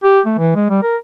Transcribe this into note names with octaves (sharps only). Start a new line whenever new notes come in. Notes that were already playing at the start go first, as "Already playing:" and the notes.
G4
A3
E3
G#3
G3
A#4